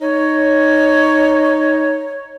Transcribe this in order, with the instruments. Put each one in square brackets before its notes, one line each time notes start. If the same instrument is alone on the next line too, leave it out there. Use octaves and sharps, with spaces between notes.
[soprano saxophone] D#4 [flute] C#5